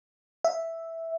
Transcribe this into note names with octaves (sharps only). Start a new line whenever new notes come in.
E5